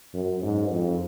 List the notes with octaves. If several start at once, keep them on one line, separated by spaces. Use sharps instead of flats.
F#2
G#2
F2